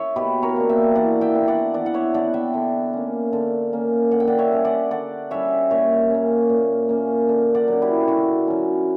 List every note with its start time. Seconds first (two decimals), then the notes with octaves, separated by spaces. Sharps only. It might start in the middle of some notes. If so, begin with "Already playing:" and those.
Already playing: C#5 E5
0.16 B2 G4 B4
0.43 A#4 C#5
0.56 A#3 D4
0.69 E5 G5
0.95 E3 D5 F#5
1.21 E5 G5
1.35 B3 D4
1.48 D5 F#5
1.74 E3 D5 F#5
1.86 F#5
1.94 C#5 E5
2.14 B3 D4 D5 F#5
2.34 E5 G5
2.54 D3
2.93 A#3 C#4
3.33 D3
3.73 A#3 C#4
4.12 D3 F#5
4.20 G5
4.28 D5 F#5
4.38 C#5 E5
4.52 G3 C#4
4.65 D5 F#5
4.91 D3 D5 F#5
5.31 G3 C#4 C#5 E5
5.70 A#2 C#5 E5
6.10 A#3 C#4
6.50 A#2
6.89 A#3 C#4
7.29 D3
7.55 D5 F#5
7.68 F#3 C#4
7.82 E4 G4
8.08 D3 F#4
8.48 F#3 C#4